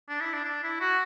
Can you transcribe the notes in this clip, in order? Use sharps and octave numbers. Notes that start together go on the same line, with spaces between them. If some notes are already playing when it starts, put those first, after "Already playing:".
D4
E4
D4
D4
E4
F#4